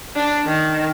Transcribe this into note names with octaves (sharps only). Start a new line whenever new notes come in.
D4
D#3